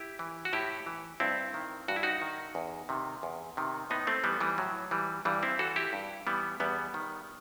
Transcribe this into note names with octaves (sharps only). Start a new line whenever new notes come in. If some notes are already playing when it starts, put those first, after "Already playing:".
Already playing: E4 G4
E3
F#4
A2 E4 G4
E3
G2 C4 E4
D#3
G2 F#4
E4
D#4 F#4
D#3
E2
C3 D#3
E2
C3 D#3
A2 B3 D#4
A3 C4
E3 G3 B3
E3 G3
A2 F#3
E3 G3
G2 E3 G3
C4 E4
E3 F#4 A4
E4 G4
G2
E3 G3 B3
E2 G3 B3
D#3